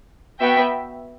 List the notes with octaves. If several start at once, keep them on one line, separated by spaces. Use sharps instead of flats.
B3 F#4 B4 E5 G5